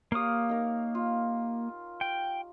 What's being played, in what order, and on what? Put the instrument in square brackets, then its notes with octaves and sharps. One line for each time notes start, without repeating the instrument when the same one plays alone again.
[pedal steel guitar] A#3 D#6 [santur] G4 C#5 F5
[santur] D#4 A#4
F4
[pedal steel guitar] G5